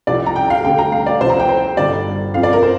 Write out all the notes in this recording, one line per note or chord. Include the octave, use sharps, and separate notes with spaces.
C2 C3 F3 D5
A#5
G5
F5
D2 D3 G3 G5
A#5
F5
D5
C2 C3 F3 C5
A#5
G5
C5
G1 G2 D3 G3 D5
G1 F2 F3 C4 F5
D5
A#4
C5